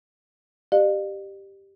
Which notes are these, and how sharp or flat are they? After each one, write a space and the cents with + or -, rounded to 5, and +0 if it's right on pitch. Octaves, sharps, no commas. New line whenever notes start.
G4 +0 D5 +45 F5 +0